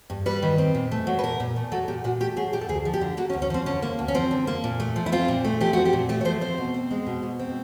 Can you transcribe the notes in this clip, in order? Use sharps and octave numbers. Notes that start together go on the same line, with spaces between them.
G2
G3 B4
D#3
C4
A#2
A3
F#3
B4
A#2 A#4
A#2
A3
F#3 A4
A#2 G4
A#2 F#4
A3 G4
F#3 G#4
A#2 G4
A4
D2 G#4
F3
G4
D3
A#3 F#4
C#4
D2
C#4
F3 C4
D3 C#4
A#3
D2
C#4
F3 C4
D3
A#3
A#2
A3
F3
E4
C4 F4
A#2
A3
F3 G4
C4 F#4
G4
A#2
A3 G4
C#5
F3 C5
C4 C5
B2
C4
G#3
B2
B2
C4